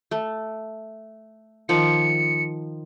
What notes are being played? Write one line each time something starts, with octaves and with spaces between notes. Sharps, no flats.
A3
D#3 F3 C#7